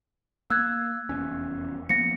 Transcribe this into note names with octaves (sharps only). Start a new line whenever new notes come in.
A#3 E6 F#6 G#6
F1 E2 C#4
F3 A#3 B3 A#6 C#7